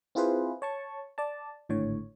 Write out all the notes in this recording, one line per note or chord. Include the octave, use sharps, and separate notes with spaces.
C4 E4 F4 G#4 B4 C5
C#5 A5 C#6
D5 A5
G#1 A2 D3 C#5